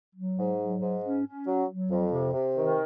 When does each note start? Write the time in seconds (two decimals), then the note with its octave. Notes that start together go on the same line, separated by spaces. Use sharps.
0.15 F#3
0.38 G#2
0.59 F#3
0.81 G#2
1.03 C#4
1.25 C#4
1.46 F#3
1.68 F#3
1.91 F2
2.13 C3
2.34 C3
2.57 D#3